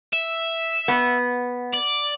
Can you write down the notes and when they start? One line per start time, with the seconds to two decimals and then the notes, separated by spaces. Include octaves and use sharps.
0.13 E5
0.88 B3
1.74 D5